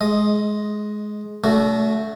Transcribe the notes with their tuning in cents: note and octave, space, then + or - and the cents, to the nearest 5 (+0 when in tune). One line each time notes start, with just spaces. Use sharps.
G#3 +15 D#5 +0
D3 -45 A3 +0 F#4 +0